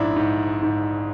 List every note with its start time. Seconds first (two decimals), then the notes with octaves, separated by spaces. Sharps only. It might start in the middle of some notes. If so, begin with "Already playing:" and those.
Already playing: A#1 G#2 D4 E4
0.16 G#2
0.62 G#2